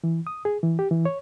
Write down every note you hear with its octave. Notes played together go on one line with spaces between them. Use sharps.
E3
D#6
G#4
E3
G4
E3
C#5